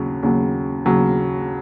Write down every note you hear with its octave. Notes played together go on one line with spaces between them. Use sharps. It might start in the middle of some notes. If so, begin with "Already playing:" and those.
Already playing: D#2 C#3 F#3
D#2 C#3 F#3
D#2 C#3 F#3